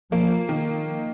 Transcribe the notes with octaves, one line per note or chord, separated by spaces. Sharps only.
F3 A#3
D#3